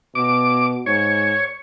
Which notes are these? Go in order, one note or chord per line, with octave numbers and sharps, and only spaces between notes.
B2 D6
G#2 C#5